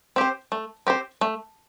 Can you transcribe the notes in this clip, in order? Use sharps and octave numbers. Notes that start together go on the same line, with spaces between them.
C4 G4 C5
A3
C4 G4 C5
A3